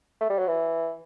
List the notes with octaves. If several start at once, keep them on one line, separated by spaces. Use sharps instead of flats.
A3
G3
F#3
E3